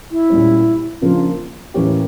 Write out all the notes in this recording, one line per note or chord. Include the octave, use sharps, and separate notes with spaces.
E4
A#2 G3 C#4
C#3 F3 A#3 D4 F4
A2 E3 A#3 C#4 G4